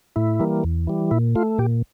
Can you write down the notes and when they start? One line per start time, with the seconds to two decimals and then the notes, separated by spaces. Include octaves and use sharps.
0.16 A2 E4
0.40 E3 G3 A#3
0.64 E2
0.87 E3 G3
1.11 A#2 E4
1.35 A3 F4
1.58 A#2 G4